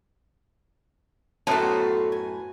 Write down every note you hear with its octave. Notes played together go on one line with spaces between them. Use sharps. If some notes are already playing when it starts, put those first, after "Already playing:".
F#2 A2 B3 F#4 A4 C5 C#5 A5
G#5